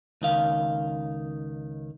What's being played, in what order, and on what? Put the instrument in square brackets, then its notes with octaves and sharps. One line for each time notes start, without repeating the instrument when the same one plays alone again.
[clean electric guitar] C#2 D#3 F5